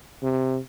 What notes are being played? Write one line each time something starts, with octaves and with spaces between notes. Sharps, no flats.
C3